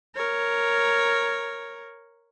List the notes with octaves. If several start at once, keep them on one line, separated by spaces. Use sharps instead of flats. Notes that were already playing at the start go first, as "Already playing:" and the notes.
A#4 C#5